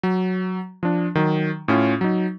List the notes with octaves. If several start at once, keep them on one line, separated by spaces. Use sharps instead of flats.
F#3
F3 D4
D#3 F#3
A2 C#4 F4
F#3 D#4